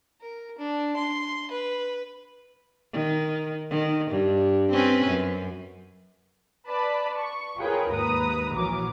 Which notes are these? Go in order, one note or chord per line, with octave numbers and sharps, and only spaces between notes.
A#4
D4
C6
B4
D#3
D#3
G2
C4 C#4 B4
F#2
B4 D5 A5 B5
C#6
F4 G#4 A#4 B4 C#5 G5
D#2 G#2 B4 A#5 D#6
A#1 E3 F#3 A#4 D6